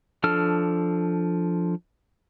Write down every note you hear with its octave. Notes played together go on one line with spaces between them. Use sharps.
F3 D4 A4 F6